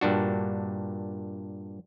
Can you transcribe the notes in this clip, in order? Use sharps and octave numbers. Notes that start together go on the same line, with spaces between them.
G2 A#2 D4 F#4